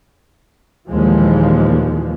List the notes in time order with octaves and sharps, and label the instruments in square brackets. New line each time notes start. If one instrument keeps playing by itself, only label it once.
[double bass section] D#2 A#2 E3 F3 G#3